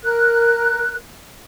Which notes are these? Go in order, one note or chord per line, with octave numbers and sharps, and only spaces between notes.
A#4 F#6